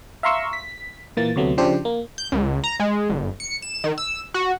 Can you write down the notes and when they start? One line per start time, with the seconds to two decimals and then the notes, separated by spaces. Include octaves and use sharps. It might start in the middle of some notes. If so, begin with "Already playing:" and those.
0.23 E5 F5 A#5 C6 C#6 E6
0.53 B6
1.17 A#2 E3 A#3 A6
1.36 D2 C3 F#3 A3 B3
1.58 C#3 F3 D4 G4 C5
1.85 A#3
2.18 G6
2.32 C#2
2.64 A#5
2.80 G#3
3.09 G1
3.40 C#7
3.62 E7
3.84 D#3
3.98 E6
4.34 F#4